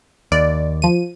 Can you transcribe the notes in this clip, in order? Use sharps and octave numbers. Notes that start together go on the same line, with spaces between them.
D#2 D5
F3 D#7